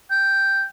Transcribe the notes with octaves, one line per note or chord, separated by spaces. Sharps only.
G5